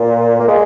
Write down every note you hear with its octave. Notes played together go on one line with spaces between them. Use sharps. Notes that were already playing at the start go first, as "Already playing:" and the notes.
Already playing: A#2
A#3
G#3